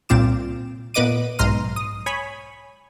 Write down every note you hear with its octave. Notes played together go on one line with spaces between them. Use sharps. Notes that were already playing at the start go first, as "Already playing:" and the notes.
C2 A#2 C4 F4 D6 E7
A#2 B3 B4 D#5 D6 D#7
B1 G#2 A#5 C6 F6 D#7
D#6
C#5 G#5 B5